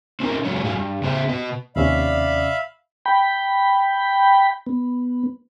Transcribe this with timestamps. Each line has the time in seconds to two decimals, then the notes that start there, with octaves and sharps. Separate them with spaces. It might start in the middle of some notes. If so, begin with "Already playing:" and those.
0.20 C4 C#4 D#4 A#4
0.45 F#2 F#3 G#3 C#5
0.63 G#2 F#3 F5 G#5
0.76 G2
1.02 C#3 B3 D4 G#4 C5 E5
1.29 B2 B4 D#5
1.76 D#2 C3 C#4 D5 E5 F5 B5
3.05 G5 B5
4.66 B3